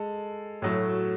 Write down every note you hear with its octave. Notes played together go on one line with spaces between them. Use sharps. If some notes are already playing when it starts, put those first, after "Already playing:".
Already playing: G#3 A4
A2 F#3 A3